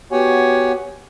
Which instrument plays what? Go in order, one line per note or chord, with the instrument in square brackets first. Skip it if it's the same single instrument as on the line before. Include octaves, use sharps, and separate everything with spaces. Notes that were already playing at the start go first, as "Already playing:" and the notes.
[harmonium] B3 F#4 G4 C#5 F#5 G#5